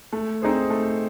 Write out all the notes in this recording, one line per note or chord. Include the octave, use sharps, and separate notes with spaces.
A3
C4 D#4 G#4 C5
A3